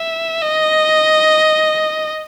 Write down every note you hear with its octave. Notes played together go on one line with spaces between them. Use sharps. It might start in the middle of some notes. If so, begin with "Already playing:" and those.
Already playing: E5
D#5